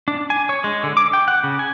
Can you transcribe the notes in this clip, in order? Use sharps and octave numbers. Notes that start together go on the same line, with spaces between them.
D4
G#5
C#5
G#3
D3
D6
G5
F#5
C#3
G#5